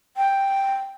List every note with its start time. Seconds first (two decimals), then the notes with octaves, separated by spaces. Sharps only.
0.17 G5